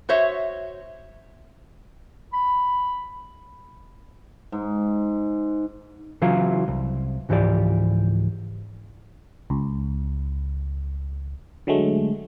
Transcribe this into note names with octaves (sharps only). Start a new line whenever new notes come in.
F#4 C5 C#5 E5
B5
G#2
C#3 E3 F#3 E4 F4
C2
C#2 G#2 E3 F3 G4 D5
C#2
D3 F#3 G#3 A3